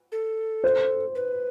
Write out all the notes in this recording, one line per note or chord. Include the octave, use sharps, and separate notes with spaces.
A4
C5
B4